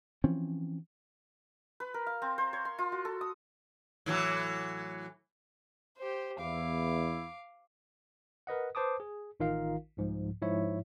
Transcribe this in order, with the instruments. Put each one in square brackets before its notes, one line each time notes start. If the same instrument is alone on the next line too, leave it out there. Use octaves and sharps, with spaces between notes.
[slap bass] E3 F3 C4 C#4
[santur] B4
A#4
F5
C4
C5
C#5
C6
F4
F#4
A4
D#6
[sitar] A2 E3 F#3
[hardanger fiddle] G4 C5
[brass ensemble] E2 E4 [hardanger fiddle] F5 D6
[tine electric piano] A#4 B4 D#5 F#5
B4 C5 A5 D6 D#6
G#4
A1 D#3 D#4 F4 A#4 F5
C2 G#2 F3
G#2 F3 E4 C#5 E5